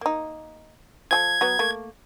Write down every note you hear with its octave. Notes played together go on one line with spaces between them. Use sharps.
A#3 D#4
F3 G#4 A4 G#6
F#3 B3
A3 A#3